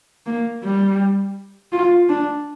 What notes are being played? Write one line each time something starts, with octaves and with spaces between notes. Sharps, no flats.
A#3
G3
F4
D4